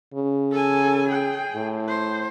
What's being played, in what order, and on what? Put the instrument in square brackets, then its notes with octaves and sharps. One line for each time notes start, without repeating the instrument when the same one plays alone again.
[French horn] C#3
[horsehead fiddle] A4 G#5
G#4 G5
[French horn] A2
[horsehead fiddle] C5